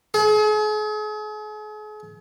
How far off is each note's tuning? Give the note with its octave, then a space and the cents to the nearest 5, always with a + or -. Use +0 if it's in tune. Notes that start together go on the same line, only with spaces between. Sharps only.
G#4 +40